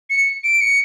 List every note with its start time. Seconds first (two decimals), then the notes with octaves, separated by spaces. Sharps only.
0.10 C#7
0.44 D7
0.61 C#7